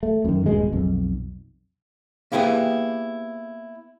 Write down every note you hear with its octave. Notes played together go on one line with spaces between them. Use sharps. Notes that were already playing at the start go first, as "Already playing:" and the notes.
A3
F#2 D#3
D#1 G2 B2 G#3
B1 F2
A#3 B3 E4 G4 G#4 B4